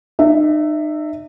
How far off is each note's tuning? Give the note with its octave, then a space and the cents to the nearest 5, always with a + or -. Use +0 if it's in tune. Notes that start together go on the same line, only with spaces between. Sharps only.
D#4 -40 E5 +0